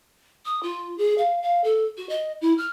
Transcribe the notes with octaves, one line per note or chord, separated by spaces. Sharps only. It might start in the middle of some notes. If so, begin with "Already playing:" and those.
D#6
F4
G#4
F5
F5
A4
F#4
D#5
E4
F6